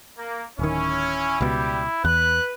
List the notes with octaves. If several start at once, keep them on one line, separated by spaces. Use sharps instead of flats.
A#3
D1 D#3 C#4 E4
C#2 B2 G3 G4
E2 B4 F#6